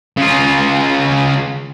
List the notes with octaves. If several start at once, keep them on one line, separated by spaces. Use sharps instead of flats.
C#3 F4